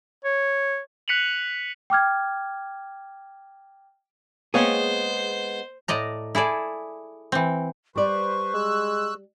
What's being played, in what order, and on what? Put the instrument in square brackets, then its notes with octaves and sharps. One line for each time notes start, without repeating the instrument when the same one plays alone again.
[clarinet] C#5
[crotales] F#6 B6 C#7 D#7 F7 F#7
[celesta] G5 D6 F6 G#6
[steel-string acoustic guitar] G#3 B3 [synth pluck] A#3 F5 G5 [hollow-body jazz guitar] G#4 C#5 [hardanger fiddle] C5
[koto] A2 D5 D#5 A#5
E4 G#4 A4 D5
E3 C4
[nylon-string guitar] G3 D5 [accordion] B4 C5 [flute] C#6
[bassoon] G#3 [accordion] E6 F#6